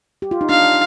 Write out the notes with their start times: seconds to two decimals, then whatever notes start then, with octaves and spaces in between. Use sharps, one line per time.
0.22 G4
0.31 F4
0.41 D#4
0.49 D4 F5